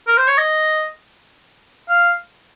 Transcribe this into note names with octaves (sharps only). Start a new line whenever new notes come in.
A#4
C5
C#5
D#5
F5